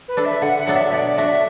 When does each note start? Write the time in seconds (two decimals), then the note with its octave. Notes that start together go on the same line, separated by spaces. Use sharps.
0.08 B4
0.17 D4 A4
0.25 E5
0.42 D3 F#5
0.58 F#5
0.67 F#3 B3 D4 A4
0.76 E5
0.92 B2 D5
1.17 A3 D4 F#4 E5